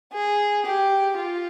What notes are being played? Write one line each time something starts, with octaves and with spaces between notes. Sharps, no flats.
G#4
G4
F4